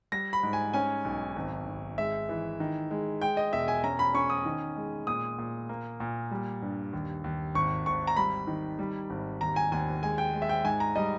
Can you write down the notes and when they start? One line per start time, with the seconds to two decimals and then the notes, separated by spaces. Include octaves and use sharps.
0.12 G3 A#6
0.33 B5
0.43 G#2
0.53 G#5
0.73 C#4 G#5
1.05 B1
1.36 G#1
1.67 G#1
1.98 G#3 E5
2.29 E3
2.60 D#3
2.91 G#3
3.21 G#3 G5
3.37 D#5
3.53 E1 E5
3.68 G#5
3.84 C#4 A#5
3.99 B5
4.14 C#4 C#6
4.30 D#6
4.45 D#3
4.76 G#3
5.07 A#2 D#6
5.38 A#2
5.69 A#3
6.00 A#2
6.31 G3
6.62 G2
6.93 D#2
7.24 D#2
7.55 G#1 C#6
7.86 G#1 C#6
8.07 A#5
8.17 G3 B5
8.47 D#3
8.79 G3
9.10 G#1
9.41 D#2 A#5
9.56 G#5
9.72 D#2 G#5
10.02 G#3 G#5
10.18 G5
10.33 G#3
10.42 E5
10.49 G5
10.64 G#2 G#5
10.80 A#5
10.96 G3 D#5